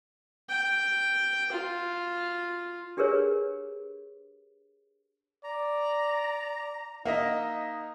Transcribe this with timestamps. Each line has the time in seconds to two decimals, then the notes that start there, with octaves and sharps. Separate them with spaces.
0.49 G5
1.52 F4
2.97 D4 G4 G#4 A#4 B4 C#5
5.45 D5 A#5
7.05 A#3 D#4 D#5 E5 F#5